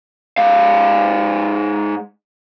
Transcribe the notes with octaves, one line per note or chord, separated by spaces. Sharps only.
G#2 F5